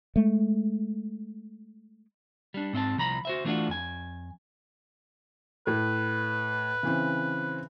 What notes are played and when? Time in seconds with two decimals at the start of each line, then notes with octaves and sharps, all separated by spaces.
0.16 G#3 A3
2.54 G3 D4
2.73 G#2 C4 D#5 A5
2.97 C2 F3 A#5 B5
3.25 F#4 C5 E5
3.45 E3 A3 B3 D4 F4 F#4
3.68 F2 G#5
5.67 A2 B4
6.83 C#3 E3 C4